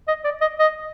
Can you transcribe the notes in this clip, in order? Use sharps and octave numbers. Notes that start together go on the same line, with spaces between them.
D#5
D5
D#5
D#5